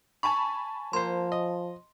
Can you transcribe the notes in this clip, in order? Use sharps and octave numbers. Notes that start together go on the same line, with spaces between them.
G#5 A5 B5 C#6
F3 A#3 C5 C6
D#5